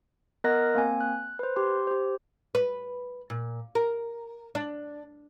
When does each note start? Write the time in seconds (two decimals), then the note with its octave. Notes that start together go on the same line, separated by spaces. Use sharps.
0.44 B3 A#4 D#5 A#5 F#6 A#6
0.75 A#3 C4 G#5
1.00 F#6
1.39 B4 C5
1.56 G4 C6
1.87 G4 C5
2.55 B4
3.30 A#2
3.75 A#4
4.55 D4